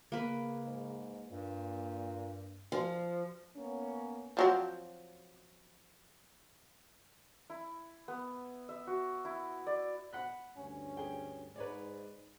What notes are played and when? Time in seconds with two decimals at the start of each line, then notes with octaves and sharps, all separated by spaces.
0.12 C#3 A#3 B4
0.64 G#2
1.31 G2 A#2
2.72 F3
3.56 A#3 B3 C#4
4.37 F3 F#3 C4
7.50 E4
8.08 B3
8.69 E5
8.87 F#4
9.25 E4
9.67 D5
10.13 F#5 B5 F#6
10.57 D2 G2 C#4
10.97 G#4 G5
11.56 G#2 B4 C#5 D5